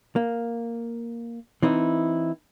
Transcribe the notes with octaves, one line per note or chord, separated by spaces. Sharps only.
A#3
E3 C4 D#4 E4